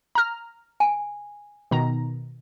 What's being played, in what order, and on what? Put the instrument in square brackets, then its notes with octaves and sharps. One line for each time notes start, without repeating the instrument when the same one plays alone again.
[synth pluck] A#5 F6
[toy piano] G#5
[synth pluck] B2 D#3 A#5